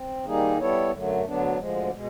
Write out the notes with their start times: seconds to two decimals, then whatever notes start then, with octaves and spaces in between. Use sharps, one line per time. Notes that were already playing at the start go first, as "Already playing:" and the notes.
Already playing: C4
0.25 D#3 G3 A#3 D#4 G#4
0.57 G3 B3 E4 A4 C#5
0.91 F#2 D3 F#3 A3
1.25 D2 D3 F#3 B3 D4
1.57 D2 D3 F3 G#3
1.92 B2 G#3